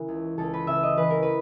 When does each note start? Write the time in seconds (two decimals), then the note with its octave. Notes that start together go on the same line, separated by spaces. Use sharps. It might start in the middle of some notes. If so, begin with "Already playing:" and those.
Already playing: C#3 E3 A#4
0.08 C#2
0.38 C#2 A4
0.53 B4
0.67 C#3 E5
0.83 D#5
0.97 E3 B4
1.10 A#4
1.22 B4